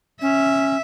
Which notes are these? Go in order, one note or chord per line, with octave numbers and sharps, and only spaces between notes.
C#4 E5